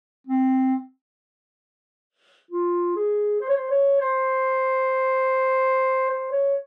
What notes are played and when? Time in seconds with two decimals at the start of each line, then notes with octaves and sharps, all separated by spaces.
0.27 C4
2.51 F4
2.96 G#4
3.41 C5
3.49 C#5
3.56 C5
3.70 C#5
4.00 C5
6.09 C5
6.32 C#5